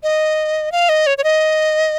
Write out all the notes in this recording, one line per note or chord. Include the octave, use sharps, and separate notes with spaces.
D#5
F5
D#5
C#5
C#5
D#5